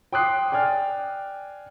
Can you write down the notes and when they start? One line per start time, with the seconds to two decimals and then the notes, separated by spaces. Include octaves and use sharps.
0.13 G5 C6 D6 D#6 F#6 C7
0.52 D5 G5 G#5 F6